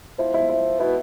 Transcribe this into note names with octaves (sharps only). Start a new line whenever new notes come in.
F3 E4
E4
E4
B2 E4